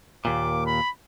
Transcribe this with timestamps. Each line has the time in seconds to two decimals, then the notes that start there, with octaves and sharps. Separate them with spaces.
0.25 D#2 A#2 D6
0.66 B5